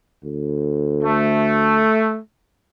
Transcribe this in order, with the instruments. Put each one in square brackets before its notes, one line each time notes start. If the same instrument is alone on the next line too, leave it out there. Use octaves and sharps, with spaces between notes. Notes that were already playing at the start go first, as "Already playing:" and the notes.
[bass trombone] D2
[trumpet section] A3